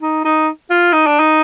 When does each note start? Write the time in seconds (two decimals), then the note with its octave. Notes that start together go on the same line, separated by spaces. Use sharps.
0.02 D#4
0.24 D#4
0.70 F4
0.93 D#4
1.06 D4
1.19 D#4